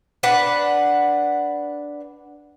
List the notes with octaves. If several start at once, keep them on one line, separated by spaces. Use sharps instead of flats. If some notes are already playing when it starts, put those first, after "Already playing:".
D4 B4 F#5